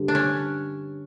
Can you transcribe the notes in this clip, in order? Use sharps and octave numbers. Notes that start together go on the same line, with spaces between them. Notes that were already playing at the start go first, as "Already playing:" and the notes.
Already playing: G2 D3
D4
C#4